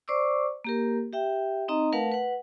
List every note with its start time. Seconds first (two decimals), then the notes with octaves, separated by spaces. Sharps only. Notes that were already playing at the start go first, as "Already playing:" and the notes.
0.08 C5 D5 C#6 D6 E6
0.64 A#3 G4 A#4
1.13 G4 E5 G5
1.68 C4 D#4 D#5 A#5
1.93 A3 A#4 B4 F5 F#5 A5
2.12 B4 F#5